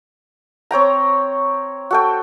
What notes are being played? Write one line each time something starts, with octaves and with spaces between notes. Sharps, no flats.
C4 C#5 G5 A#5
F#4 A4 G5